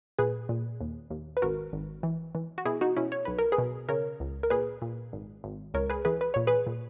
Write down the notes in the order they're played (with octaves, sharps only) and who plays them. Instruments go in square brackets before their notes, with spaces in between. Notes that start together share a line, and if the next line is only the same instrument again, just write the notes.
[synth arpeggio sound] A#2 G#4 B4
A#2
D#2
D#2
B4
G#1 F#4 A#4
G#1
E3
E3
F#4
B2 E4 G#4
D#4 F#4
B2 C#4 E4
C#5
B1 B4
A#4
G#4 B4
B2
C#3 A#4 C#5
C#2
A#4
A#2 G#4 B4
A#2
G#1
G#1
C#2 A#4 C#5
G#4 B4
E3 G#4 B4
B4
A#2 C#5
G#4 B4
A#2